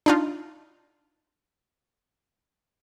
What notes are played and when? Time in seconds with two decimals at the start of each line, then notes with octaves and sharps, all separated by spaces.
0.06 D4 D#4 F4